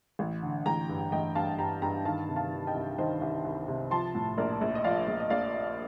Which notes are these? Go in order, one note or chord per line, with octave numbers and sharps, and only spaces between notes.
A1
D3
A1 G5 A#5
G2
A1 D#5 G5
G2 F5 A5
G2 G5 A#5
G2 G5 A#5
D#3 F5 A5
C3
F5 A5
D#3
D#5 G5
C2
D#3 C5 D#5
C2
C2
C3
F3 A5 C6
A2
A#1 A#4 D5
A#1
D#5
F3 D5 F5
A#1
D#5
A#1 D5 F5